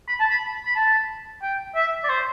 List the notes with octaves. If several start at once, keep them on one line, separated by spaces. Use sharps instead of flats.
B5
A5
B5
B5
A5
G5
E5
D5
C5